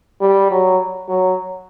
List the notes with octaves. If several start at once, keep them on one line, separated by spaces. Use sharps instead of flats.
G3
F#3
F#3